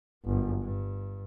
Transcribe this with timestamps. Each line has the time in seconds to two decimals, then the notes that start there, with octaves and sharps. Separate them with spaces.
0.25 G1 F#2
0.61 G2